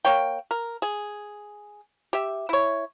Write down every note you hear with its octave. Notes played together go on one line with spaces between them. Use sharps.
A#3 C#5 G5
A#4
G#4
G4 E5
E4 C#5